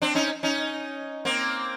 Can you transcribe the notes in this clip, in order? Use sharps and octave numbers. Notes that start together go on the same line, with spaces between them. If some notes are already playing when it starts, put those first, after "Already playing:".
C4 D4
C#4 D#4
C#4 D#4
A#3 C4